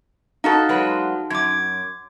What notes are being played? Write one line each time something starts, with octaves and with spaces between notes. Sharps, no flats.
D#4 F#4 A4 F5
F#3 G#3 B4
F#2 D6 G#6